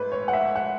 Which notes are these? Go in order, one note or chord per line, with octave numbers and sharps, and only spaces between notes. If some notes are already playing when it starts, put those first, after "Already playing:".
Already playing: G#2 A3 B4
C#5
F#5
E5
F#5